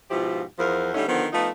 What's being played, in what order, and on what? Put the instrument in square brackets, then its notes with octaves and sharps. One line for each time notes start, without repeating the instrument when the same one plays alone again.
[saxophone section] G#2 B2 F3 E4 F4 G4
E2 F3 A#4
D3 G3 A3 C#4 D#4
D3 D#3 F3 B3
F3 A3 B3 D#4 F4